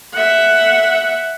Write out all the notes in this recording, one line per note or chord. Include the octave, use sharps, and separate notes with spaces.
E5 F#5